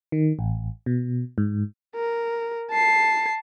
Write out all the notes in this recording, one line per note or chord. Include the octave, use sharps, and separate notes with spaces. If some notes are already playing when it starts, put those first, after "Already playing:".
D#3
A1
B2
G#2
A#4
A5 C7